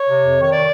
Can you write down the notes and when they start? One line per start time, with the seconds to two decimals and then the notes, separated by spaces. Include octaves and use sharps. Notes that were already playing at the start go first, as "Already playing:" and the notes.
Already playing: C#5
0.08 C3
0.23 F2
0.38 D#3
0.43 C#5
0.52 D5